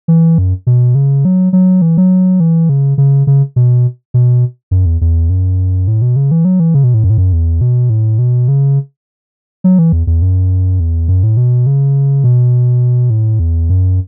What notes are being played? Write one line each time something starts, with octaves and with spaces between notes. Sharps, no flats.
E3
F#2
B2
C#3
F#3
F#3
E3
F#3
E3
C#3
C#3
C#3
B2
B2
F#2
E2
E2
F#2
A2
B2
C#3
E3
F#3
E3
C#3
B2
A2
F#2
A2
F#2
E2
B2
A2
B2
C#3
F#3
E3
E2
E2
F#2
E2
F#2
A2
B2
C#3
B2
A2
E2
F#2